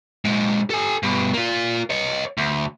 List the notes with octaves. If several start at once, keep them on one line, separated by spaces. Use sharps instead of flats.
A#2 G#3
A4 G#5
G2 B2
A#3 F4
C#5 D#5
D2